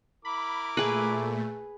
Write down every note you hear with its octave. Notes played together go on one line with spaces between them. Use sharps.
E4 A#4 B5 D6
A#2 A3 G#4 B4